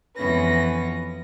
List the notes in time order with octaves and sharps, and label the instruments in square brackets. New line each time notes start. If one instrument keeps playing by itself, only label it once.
[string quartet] F2 E3 B3 C#4 B4 A#6